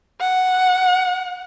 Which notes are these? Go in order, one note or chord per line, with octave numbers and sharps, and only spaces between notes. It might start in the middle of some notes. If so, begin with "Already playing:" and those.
F#5